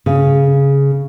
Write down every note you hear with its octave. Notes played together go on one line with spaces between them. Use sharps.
C#3